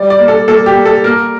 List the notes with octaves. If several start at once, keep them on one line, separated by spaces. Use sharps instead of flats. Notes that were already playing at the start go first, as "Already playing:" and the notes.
Already playing: G3 D5
D5
A#3
A4
A#3 A4
G4
A#3
A4
A#3 A#4